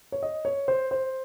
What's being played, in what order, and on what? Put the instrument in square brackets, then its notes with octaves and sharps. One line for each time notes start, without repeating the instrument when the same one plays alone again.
[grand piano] C#5
D#5
C#5
C5
C5